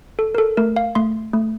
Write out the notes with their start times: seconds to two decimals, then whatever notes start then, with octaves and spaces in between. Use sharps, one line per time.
0.19 A4
0.35 A#4
0.38 A4
0.57 A3 A#4
0.76 F5
0.95 A3 C6
1.33 A3